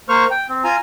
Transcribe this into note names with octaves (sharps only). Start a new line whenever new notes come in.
A#3 C5 C#6 F6
G5
C4
F4 G#5 A#5